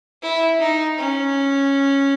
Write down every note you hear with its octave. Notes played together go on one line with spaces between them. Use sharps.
E4
D#4
C#4